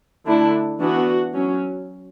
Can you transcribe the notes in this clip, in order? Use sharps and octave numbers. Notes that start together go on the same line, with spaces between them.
D3 A3 D4 E4
E3 B3 D4 F#4
F#3 C#4